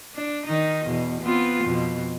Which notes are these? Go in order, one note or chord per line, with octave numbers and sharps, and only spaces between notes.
D4
D#3 D#4 D#5
E2 B2
B3 C4 F4
F2 B2